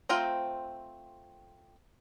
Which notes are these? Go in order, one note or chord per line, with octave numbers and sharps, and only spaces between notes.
A3 C4 F4 G5 A#5